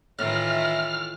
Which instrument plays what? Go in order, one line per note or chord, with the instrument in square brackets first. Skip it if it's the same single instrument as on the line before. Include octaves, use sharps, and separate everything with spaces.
[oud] A2 [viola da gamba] D#3 E3 F4 [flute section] E5 [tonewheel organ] F6